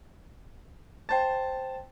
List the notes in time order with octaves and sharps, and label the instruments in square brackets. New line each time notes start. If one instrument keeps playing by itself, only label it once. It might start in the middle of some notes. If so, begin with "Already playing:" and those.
[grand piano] C5 A5 [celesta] G5 A6